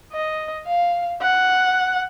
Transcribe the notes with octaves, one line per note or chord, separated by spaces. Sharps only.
D#5
F5
F#5